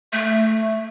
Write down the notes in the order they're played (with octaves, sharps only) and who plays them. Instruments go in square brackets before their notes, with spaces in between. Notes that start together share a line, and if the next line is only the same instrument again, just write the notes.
[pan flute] A3